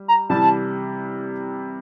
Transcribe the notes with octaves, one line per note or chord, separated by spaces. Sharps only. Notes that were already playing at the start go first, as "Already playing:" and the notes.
Already playing: G3
A#5
C3 E3 G3 A5